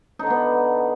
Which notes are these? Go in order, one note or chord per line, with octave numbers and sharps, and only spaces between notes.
D3 B3 D4 D#4